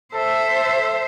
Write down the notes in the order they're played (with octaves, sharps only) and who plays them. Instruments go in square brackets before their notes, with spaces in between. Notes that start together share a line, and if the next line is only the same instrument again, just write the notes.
[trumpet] A4 [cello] C5 E5